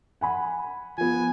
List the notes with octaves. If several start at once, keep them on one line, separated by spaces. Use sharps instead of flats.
F#5 G#5 B5
F3 B3 G#5